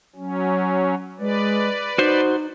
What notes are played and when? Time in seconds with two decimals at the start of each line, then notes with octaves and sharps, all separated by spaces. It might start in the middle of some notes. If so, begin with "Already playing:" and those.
0.16 F#3 C#4
1.19 G#3 B4 D5
1.98 D#4 F#4 C5